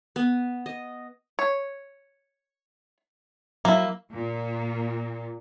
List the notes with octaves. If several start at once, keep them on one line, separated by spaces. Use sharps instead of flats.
B3
D#5
C#5
F#3 A#3 E4
A#2